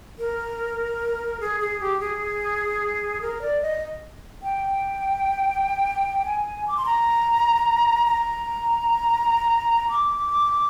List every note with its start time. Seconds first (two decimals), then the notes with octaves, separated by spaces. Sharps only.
0.19 A#4
1.40 G#4
1.60 G#4
1.80 G4
2.00 G#4
3.21 A#4
3.41 D5
3.62 D#5
4.43 G5
6.25 G#5
6.68 D6
6.77 C6
6.86 A#5
8.07 A#5
9.89 D6